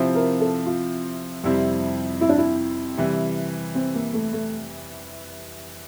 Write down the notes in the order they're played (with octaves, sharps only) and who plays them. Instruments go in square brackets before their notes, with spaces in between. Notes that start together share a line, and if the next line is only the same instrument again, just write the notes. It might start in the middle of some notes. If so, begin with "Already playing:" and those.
Already playing: [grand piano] C3 F3 C4 E4
[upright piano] A#4
A4
F4
[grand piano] F2 C3 G3 C4 E4
[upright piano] E4
D4
E4
[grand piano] C3 E3 G3
[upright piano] C4
A#3
A3
A3